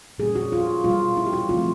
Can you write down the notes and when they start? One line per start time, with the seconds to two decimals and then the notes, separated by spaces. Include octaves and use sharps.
0.18 A#2 G3 A#3 C#4 G#4
0.35 F#4
0.52 F4
0.84 B2 G3 A#3 F4
1.17 E4
1.26 G4
1.33 F#4
1.49 D3 F3 A3 C4 F4